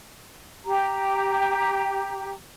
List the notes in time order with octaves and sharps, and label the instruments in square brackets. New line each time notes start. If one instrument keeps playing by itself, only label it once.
[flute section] G4 A#5